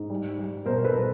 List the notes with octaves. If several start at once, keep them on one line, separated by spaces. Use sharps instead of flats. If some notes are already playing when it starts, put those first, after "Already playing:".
Already playing: G#2 G#3
G3
G3
B2 A#4 C5
C5
A4 B4
B2